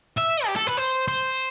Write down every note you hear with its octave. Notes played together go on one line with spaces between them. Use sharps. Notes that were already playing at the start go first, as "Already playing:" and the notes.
E5
G4
A4
B4
C5
C5